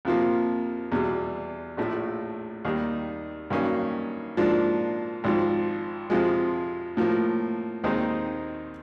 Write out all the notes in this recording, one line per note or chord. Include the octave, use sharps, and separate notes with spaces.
F2 C3 F3 A#3
E2 B2 G3
A#1 A2 F3 A3
D#2 D#3 G3
G2 D#3 F#3 A#3 C#4
G#2 F3 A#3 D4
G#1 G#2 F3
F2 C3 F3 G#3
A2 F3 A#3
D#2 D#3 G#3 C4 D#4